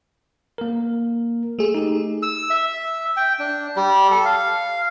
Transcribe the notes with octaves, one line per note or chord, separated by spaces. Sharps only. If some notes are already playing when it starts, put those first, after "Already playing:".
A#3 A#4
A3 G#4
D#4 G4
E6
E5
G5
D4
G3
A4
F5